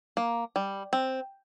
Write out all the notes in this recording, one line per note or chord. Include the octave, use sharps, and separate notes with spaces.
A#3
G3
C4